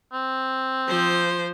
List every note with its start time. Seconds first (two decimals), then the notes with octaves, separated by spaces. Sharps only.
0.13 C4
0.88 F3 C5